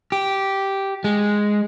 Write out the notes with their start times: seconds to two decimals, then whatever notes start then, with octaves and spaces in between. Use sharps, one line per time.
0.12 G4
1.04 G#3